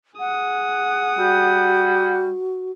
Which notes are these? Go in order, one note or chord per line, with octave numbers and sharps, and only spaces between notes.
G#4 F#5 D#6
G3 F#4